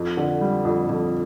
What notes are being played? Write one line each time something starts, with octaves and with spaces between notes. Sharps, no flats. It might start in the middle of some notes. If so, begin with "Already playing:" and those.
Already playing: F2
D3
G3
F2
F2